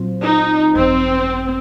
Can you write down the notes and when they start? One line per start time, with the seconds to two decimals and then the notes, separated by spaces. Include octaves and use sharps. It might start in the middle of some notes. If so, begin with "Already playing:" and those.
Already playing: A#2 F#3 C4 F4 C5
0.22 D#4
0.75 G#1 F#2 F3 C4